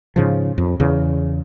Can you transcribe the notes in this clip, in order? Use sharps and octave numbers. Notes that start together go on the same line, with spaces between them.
G#2 C#3 F3
F2
E2 C#3